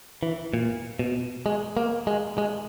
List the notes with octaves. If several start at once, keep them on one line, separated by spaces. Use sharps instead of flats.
E3
A#2
B2
G#3
A#3
G#3
G#3